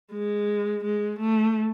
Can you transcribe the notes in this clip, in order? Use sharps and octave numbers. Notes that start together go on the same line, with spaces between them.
G#3
G#3
A3